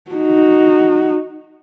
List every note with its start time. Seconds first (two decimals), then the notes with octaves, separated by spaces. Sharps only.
0.11 D#4 F#4